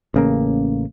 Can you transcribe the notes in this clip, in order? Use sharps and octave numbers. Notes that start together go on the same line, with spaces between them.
A1 C#3 A#3